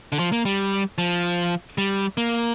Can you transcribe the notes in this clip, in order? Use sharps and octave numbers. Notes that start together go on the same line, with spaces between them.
D3
F3
A#3
G3
F3
G3
A#3